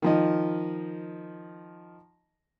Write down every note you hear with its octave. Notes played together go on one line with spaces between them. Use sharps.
D#3 F3 D#5